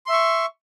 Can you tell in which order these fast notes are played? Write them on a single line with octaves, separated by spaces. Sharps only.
C6 E5 C#6